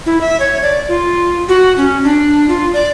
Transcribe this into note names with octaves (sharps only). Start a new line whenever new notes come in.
E4
E5
C#5
D5
F4
F#4
C#4
D4
F4
D5